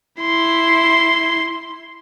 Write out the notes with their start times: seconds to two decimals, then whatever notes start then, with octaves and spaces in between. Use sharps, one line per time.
0.21 E4 C6